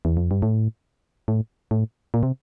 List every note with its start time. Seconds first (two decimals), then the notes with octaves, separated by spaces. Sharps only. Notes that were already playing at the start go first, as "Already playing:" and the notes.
0.05 E2
0.17 F2
0.31 G2
0.42 A2
1.28 A2
1.71 A2
2.14 A#2
2.23 C3